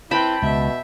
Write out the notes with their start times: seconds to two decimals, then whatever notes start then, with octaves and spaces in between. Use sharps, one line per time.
0.11 C4 E4 B4 G5 A5 B5
0.42 C#2 B2 E5